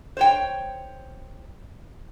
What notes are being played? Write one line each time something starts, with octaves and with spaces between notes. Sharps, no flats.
C5 C#5 G5